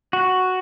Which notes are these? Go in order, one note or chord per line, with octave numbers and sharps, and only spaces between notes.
F#4